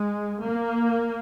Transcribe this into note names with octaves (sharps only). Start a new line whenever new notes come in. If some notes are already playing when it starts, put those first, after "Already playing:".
Already playing: G#3
A#3